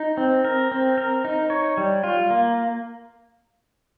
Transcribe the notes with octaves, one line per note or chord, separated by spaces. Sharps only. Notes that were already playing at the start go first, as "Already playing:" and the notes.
Already playing: D#4
C4
A#4
C4
A#4
D#4
C#5
G3
F4
A#3